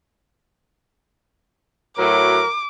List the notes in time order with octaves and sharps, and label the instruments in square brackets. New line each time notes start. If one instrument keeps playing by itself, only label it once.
[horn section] A2 F#3 [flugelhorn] A#4 [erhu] D6